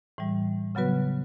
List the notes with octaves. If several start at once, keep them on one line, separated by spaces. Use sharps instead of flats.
A2 E3 G3
C#3 F#3 B3 F#4 B4